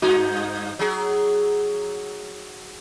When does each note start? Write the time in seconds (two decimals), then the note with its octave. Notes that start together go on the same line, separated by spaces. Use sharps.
0.02 G2 D#4 F#4
0.79 F#3 G#4